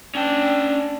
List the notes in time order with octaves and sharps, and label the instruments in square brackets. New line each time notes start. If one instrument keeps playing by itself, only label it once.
[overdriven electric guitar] C#4 G5 [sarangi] D4